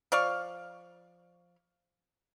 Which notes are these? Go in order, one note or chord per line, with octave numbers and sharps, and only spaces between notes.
F3 D5 F5 C#6